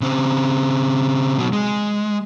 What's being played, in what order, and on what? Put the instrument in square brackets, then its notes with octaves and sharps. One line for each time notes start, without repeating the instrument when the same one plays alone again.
[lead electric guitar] C#3 C4
B2 F#3
G#3